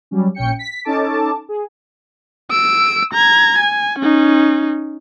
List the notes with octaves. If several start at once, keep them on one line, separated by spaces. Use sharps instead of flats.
F#3 G3 C#4
A#1 C#4 G5 C#7
B6
C#4 D#4 A4 A5 D6
G#4
E6 D7
A#5 G#6
G#5
C#4 D#4